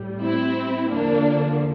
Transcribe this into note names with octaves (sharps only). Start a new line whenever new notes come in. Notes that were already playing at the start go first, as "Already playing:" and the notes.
Already playing: A2 G3
C4 E4
E2 D3 F3 A#3 D4